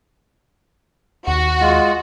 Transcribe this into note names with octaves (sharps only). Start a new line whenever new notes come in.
D#2 F#4
G#3 F4